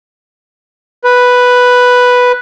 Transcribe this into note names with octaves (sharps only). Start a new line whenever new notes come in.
B4